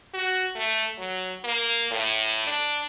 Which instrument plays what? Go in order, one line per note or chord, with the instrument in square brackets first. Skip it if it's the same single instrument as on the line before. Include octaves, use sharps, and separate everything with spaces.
[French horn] F#4
A3
F#3
A#3
A2
D4